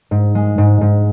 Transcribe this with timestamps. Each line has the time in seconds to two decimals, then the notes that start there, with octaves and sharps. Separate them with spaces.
0.11 G#2
0.35 G#3
0.58 G#2
0.81 G#2